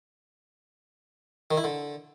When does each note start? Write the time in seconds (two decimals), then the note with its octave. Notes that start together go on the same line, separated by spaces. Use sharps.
1.51 D#3
1.57 E4
1.64 D3